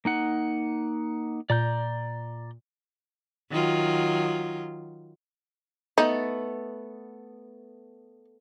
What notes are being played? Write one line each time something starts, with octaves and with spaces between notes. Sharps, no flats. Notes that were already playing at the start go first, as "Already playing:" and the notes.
A#3 D#4 F#5
A#2 D5 A#5 G6
D#3 F#3 F4
A3 B3 D#4 A4